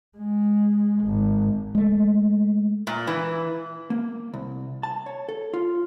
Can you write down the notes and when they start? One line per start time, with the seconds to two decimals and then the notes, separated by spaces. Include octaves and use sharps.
0.18 G#3
1.04 G#1
1.75 G#3 A3
2.87 A#2
3.07 E3
3.90 A#3
4.34 C2
4.83 A5
5.06 C#5
5.29 A4
5.53 F4